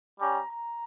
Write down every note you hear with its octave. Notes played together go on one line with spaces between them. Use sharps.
G3 C#4 G4 A#5
A#5